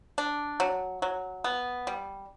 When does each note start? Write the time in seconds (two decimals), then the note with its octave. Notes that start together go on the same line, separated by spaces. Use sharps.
0.18 D4
0.60 F#3
1.02 F#3
1.44 B3
1.87 G3